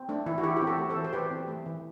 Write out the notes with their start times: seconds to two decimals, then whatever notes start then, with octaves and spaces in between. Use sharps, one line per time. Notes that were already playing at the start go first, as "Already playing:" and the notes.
Already playing: C4
0.09 A3 D4
0.26 E3 E4
0.38 F#4
0.43 E3 E4 G4
0.56 G4
0.62 C4
0.67 F#4 A4
0.78 A3
0.90 A4 C5
0.96 E3
1.05 C5
1.13 E3 G4 B4
1.31 C4
1.48 A3
1.66 E3